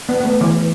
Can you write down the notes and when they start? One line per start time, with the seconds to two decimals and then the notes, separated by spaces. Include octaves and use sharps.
0.09 B3
0.21 B3
0.25 A3
0.41 E3